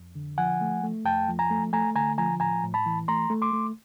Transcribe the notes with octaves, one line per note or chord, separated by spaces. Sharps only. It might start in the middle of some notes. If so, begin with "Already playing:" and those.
Already playing: F2
D3
F3 F#5 G#5
A3
A3
F2 G5 A5
F3
G#5 A#5
A3
A3 G#5 A#5
D3 G#5 A#5
F3 G#5 A#5
A2 G#5 A#5
A2
A5 B5
E3
A3 A#5 C6
A3
C6 D6
A3